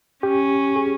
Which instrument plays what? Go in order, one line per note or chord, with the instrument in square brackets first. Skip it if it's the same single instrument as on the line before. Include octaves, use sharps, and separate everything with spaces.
[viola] C#4 [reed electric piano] G4
[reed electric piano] G#4